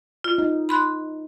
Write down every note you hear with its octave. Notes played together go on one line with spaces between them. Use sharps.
F4
D#4
B5 C6 F#6